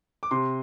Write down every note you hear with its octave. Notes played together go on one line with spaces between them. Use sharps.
D6
C3 C6